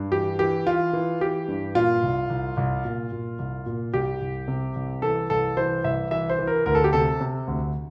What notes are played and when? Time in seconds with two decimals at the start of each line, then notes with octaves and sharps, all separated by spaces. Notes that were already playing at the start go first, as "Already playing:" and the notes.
Already playing: G2
0.11 E3 G4
0.39 E3 G4
0.66 E3 F4
0.93 E3
1.21 E3 G4
1.48 G2
1.75 A#2 F4
2.03 C2
2.30 C2
2.57 C2
2.85 A#2
3.12 A#2
3.39 C2
3.66 A#2
3.94 C2 G4
4.21 C2
4.48 C3
4.75 C2
5.02 E3 A4
5.30 C2 A4
5.57 E3 C5
5.84 C2 E5
6.11 E3 E5
6.29 C5
6.39 E3
6.47 A#4
6.66 D2 A#4
6.75 A4
6.84 G4
6.93 C3 A4
7.21 C3
7.47 D2